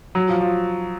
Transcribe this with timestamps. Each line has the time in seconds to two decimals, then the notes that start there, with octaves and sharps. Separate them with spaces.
0.15 F#3
0.28 F3
0.41 F3